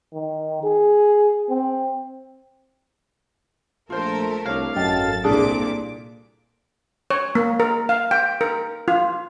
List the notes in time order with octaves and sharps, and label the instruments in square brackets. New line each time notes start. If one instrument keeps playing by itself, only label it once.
[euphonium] D#3
G#4
C4
[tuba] A#1 [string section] A3 A4 A#4 [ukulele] F4 C5
[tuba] C2 [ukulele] D4 C#5 [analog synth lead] F5
[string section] G#1 A4 A6 [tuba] F#2 [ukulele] D#5 G5 A#5
[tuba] C2 [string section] A#2 A#3 D6 [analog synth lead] D4 [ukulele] G#4 A4
[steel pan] C#5
A#3
A#4
F5
G5
A#4
F4